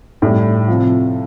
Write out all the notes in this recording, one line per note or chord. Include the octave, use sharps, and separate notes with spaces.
A2 G3
C3 F3